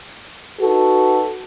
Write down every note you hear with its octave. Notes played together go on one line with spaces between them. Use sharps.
D#4 F#4 A4 B4